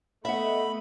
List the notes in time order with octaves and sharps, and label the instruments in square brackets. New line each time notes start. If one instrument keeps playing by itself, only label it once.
[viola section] A3 B3 D#5 [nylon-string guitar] E5 F#5 [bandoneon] B5